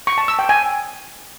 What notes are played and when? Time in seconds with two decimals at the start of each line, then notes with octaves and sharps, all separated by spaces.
0.07 C#6
0.18 A5
0.28 E6
0.39 G5
0.49 G#5